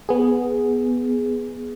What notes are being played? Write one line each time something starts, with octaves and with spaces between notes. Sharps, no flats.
B3 G#4